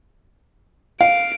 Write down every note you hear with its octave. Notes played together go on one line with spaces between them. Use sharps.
F5 D7